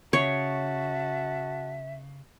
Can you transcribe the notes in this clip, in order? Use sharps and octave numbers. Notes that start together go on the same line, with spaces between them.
C#3 F#4 C#5 E5 A5